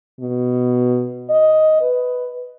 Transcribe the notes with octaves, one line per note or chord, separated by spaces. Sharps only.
B2
D#5
B4